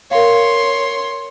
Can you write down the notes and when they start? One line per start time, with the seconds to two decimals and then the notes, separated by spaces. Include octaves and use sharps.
0.11 A#4 C#5 F5 C6